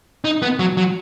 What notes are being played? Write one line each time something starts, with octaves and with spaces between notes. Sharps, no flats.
D#4
B3
F#3
F#3